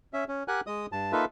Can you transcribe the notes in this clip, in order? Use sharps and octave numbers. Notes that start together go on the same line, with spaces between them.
C#4 E5
C#4
G4 A#4 F#5 G#5 F#6
G#3 D#5 D#6
G2 A5
A#3 D#4 F4 A4 B4 E5